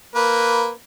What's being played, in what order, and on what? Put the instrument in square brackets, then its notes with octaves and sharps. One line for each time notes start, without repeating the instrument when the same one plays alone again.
[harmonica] A#3 B4